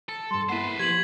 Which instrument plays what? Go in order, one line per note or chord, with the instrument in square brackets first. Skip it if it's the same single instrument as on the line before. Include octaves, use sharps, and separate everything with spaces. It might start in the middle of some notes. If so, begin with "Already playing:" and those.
[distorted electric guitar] A4
[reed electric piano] G2 G3 [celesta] C6
[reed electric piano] A#3 B3 E4 [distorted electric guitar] B4 C5 [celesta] F#5
[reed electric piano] F3 [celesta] G4 [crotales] G#6 B6 F#7